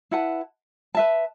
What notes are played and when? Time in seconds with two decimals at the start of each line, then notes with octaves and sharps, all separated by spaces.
0.11 E4 B4 F#5 A5
0.95 B4 E5 A5